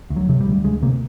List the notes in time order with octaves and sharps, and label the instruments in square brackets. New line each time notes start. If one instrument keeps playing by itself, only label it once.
[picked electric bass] D2
F#3
C3 F#3
G3
D2
D2 G#3
C3 A#3